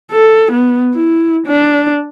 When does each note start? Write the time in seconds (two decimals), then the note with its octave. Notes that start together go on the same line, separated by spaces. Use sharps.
0.11 A4
0.52 B3
0.95 E4
1.47 D4